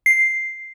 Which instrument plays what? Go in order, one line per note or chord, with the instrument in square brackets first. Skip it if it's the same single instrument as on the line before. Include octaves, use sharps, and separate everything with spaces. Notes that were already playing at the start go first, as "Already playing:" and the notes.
[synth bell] C7